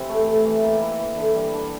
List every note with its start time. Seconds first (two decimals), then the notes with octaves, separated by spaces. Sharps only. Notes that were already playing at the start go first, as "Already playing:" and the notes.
Already playing: C3 E3 C4
0.09 A3
0.27 A2
0.46 E3
0.63 A#3
0.81 E4
1.00 E3
1.17 D3
1.35 G3
1.53 D4